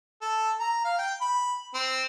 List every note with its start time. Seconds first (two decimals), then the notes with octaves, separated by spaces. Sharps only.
0.21 A4
0.59 A#5
0.84 F5
0.98 G5
1.21 B5
1.74 C4